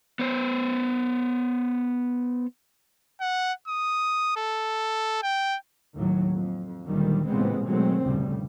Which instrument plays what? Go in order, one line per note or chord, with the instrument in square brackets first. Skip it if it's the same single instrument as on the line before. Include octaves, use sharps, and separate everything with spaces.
[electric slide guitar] B3 C5
[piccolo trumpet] F#5
D#6
A4
G5
[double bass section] D#2 A2 F#3
F2
D2 A#2 D#3 F#3 G3
A1 A#2 C#3 G#3 B3 C4
B2 D#3 F#3 G#3 A3 C4
F1 D2 A2 C#3 G3